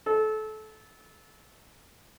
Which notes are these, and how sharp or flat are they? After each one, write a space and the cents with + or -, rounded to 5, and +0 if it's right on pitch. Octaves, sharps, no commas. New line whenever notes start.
A4 -25